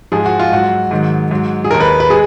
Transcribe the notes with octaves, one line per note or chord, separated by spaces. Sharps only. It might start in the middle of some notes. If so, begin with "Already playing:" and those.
G#2 F3 G#3 G#4
F#4
F4
G#2 F#3 F#4
G#2 D#3 F#3
G#2 F#3
G#4
D#2 D#3 G#3 A#4
B4
B4
G#3 G#4